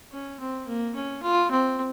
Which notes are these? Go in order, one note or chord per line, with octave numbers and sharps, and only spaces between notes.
C#4
C4
A#3
C#4
F4
C4